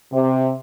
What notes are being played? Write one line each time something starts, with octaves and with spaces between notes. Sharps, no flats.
C3